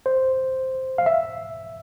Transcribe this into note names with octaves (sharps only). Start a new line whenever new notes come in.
C5
F5
E5